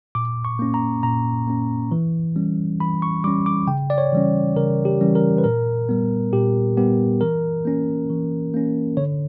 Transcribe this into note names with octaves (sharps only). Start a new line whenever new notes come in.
A#2 D6
C#6
A#3 C#4
A#5
A#2 A#5
A#3 C#4
E3
G3 C#4
E3 B5
C#6
G3 C#4 D6
D6
C#3 G5
D5
C#5
E3 G3 C#4
C#3 A#4
G4
E3 G3 C#4
A#4
B4
A#2 A#4
G3 B3
A#2 G4
G3 B3 G4
E3 A#4
A#3 C#4
E3
A#3 C#4
D3 C#5